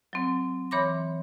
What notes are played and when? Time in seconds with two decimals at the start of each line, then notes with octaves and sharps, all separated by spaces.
0.13 F#3 C4
0.71 E3 C#5 B5 C6 D6 A#6